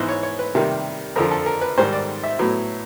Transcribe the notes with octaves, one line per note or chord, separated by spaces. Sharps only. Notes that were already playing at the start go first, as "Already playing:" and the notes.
Already playing: G#2 E3 G#3 B3 C5
C#5
C#5
B4
C3 D#3 G3 A#3
F2 D3 F3 A#4
A4
A#4
B4
G#2 D#3 G3 C5
D5
E5
A2 F#3 B3